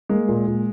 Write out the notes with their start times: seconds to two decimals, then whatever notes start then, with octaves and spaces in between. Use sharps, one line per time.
0.09 G#3 A#3
0.29 A#2
0.47 A#2